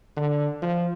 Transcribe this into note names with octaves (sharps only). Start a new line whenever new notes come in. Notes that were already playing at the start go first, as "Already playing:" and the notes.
D3
F3